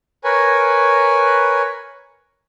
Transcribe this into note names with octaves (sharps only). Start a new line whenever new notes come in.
A#4 B4 C#5 G#5